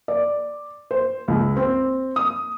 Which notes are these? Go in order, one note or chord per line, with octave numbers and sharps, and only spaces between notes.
D5
C5
C#2
C4
D#6